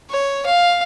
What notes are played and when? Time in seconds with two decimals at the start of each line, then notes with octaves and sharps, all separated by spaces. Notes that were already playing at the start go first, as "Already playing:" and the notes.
0.10 C#5
0.46 F5